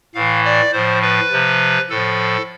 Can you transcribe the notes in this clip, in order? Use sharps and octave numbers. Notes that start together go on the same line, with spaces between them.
A2 E3 F5
D5
A2 F3 C5
B4
C3 F3
A2 F3 A4